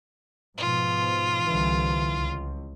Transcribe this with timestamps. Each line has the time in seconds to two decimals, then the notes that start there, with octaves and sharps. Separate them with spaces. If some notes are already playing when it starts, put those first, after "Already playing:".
0.58 G#2 B2 F3 F4
1.44 C2 D3 E3
2.15 C#2